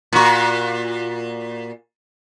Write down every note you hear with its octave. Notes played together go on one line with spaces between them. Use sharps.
A#2 F#4